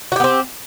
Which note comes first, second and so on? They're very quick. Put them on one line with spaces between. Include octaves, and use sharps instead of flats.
F#4 G4 B3 C4